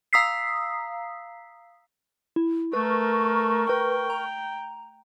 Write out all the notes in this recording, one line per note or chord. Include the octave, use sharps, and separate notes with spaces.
F5 A#5 D#6 E6 B6 C7
E4
A3 A#4 B4 C#6
B4 G5
A#5